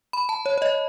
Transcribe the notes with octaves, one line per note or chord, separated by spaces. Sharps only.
B5
A5
C#5
C#5
D#5